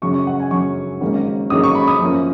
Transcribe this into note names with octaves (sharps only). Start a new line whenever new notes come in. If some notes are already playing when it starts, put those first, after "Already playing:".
F#2 C#3 F#3 C#4 C#6
C#6
F#5
G#5
F#2 C#3 F#3 C#4 C#6
G#1 G#2 F#3 A#3 C#4
G#1 G#2 F#3 A#3 C#4 D#6
C#6
B5
D#6
F#2 F3 A#3 C#4